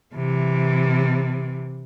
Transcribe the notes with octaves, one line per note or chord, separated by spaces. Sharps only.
C3 E3